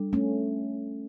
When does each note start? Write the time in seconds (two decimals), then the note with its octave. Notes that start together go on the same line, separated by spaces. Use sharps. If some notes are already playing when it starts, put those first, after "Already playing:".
Already playing: G3 D4 A4
0.13 A3 C#4